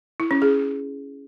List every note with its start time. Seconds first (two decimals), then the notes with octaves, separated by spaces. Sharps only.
0.20 E4
0.31 C#4
0.42 G#4